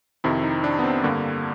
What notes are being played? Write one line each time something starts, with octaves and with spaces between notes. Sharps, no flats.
F2 C3 D#3 E4
D#4
D4
B3
C4
G2 D3 A#3